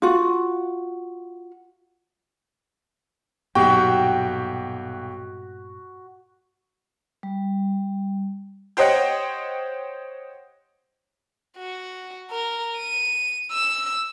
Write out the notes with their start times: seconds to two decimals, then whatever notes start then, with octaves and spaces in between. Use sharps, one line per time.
0.02 F4 F#4
3.55 B1 G2 A#2 B3 F#4 G4 G5
7.23 G3
8.77 G4 C5 C#5 D#5 F#5 G5
11.57 F#4
12.31 A#4
12.77 D#7
13.52 E6